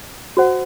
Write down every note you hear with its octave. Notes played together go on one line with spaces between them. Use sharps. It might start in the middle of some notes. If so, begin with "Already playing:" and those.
F#4 C5 F#5